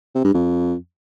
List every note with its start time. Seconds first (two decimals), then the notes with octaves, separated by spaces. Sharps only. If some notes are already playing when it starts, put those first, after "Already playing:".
0.15 C3
0.24 G2
0.34 F2